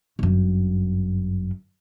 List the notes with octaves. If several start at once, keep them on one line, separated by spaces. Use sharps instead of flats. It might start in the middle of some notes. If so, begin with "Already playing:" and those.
G1 F#2